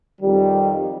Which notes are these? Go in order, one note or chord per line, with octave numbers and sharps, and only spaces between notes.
F2 D#3 G3